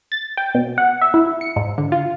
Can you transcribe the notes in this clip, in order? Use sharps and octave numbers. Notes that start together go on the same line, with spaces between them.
A6
G5
B2
F#5
E5
E4
C#7
G#2
D3
F4